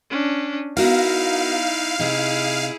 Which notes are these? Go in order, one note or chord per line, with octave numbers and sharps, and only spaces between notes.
C#4 D4
B3 D#4 E4 F#4 A#4 F5
C3 D#4 E4 G#4